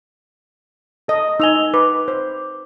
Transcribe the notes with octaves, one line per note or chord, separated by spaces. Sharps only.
A4 D#5
D#4 G#5 E6 F7 G7
B4 D6
C5